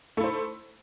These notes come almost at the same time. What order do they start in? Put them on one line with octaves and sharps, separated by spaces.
A3 E4 C5